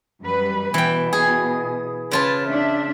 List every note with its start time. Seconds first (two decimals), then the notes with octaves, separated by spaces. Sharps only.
0.23 F#2 G3 B4
0.74 B2 E3 G5
1.13 G#4
2.11 C#3 F4 B4 A5
2.48 D4 E5